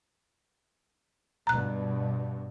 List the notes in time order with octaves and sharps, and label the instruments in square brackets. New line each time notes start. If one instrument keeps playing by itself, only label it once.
[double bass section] G2 B2 [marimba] A#5 F#6